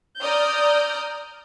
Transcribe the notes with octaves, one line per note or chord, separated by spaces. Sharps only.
D5 A#5 D#6 F6 G6